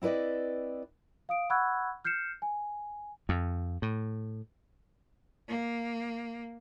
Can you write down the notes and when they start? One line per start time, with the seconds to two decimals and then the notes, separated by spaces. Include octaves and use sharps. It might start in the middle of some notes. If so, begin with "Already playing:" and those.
0.02 C4 E4 B4 D5 D#5
1.29 F5 D#6 D7
1.50 F#5 B5 C#6 E6 F#6 G#6
2.05 F6 G6 C7 C#7 E7
2.42 G#5
3.29 F2
3.82 A2
5.48 A#3